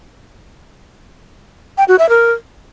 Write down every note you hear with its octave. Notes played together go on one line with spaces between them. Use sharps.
G5
F#4
E5
A#4